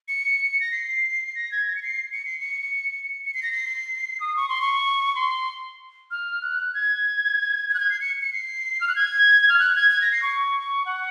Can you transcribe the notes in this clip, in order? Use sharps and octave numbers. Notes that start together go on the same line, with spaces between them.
C#7
A#6
C7
A#6
G#6
A#6
C#7
C7
C#7
C7
C#7
C#7
C#7
C7
A#6
C7
D#6
C#6
C6
C#6
C6
F6
F#6
G#6
G#6
F#6
G#6
C7
C#7
C#7
C7
F6
F#6
G#6
F6
F#6
G#6
G#6
A#6
C7
C#6
F#5